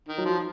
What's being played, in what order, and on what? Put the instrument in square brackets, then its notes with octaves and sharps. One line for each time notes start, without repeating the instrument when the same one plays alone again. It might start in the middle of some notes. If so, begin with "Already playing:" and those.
[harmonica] D#3
[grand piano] F#3
[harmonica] F3